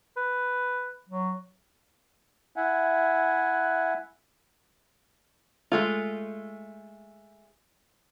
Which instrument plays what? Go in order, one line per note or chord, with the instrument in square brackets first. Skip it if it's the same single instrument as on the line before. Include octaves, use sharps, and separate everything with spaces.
[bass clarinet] B4
F#3
[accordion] E4 E5 F#5 G#5
[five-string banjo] G#3 A3 F4